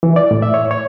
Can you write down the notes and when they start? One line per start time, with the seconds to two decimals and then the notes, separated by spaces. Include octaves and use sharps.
0.03 E3
0.16 D5
0.31 A2
0.42 E5
0.54 C#5
0.71 C#5